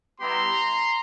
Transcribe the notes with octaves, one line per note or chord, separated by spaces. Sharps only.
G3 B3 E4 G4 A#5 C6